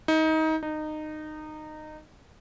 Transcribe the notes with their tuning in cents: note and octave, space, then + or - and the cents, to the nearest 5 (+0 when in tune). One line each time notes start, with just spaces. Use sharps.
D#4 +25
D#4 -20